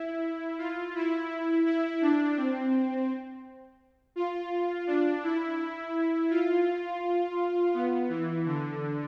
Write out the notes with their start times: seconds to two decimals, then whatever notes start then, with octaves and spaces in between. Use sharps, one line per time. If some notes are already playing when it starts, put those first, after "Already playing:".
Already playing: E4
0.58 F4
0.95 E4
1.66 E4
2.01 D4
2.37 C4
4.16 F4
4.87 D4
5.23 E4
6.31 F4
7.74 B3
8.09 E3
8.46 D3